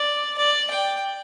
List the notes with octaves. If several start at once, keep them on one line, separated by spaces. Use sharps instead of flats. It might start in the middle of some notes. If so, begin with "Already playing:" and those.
Already playing: D5
D5
G5